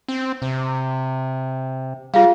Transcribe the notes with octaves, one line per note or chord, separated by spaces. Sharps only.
C4
C3
G3 F4 G#4 F5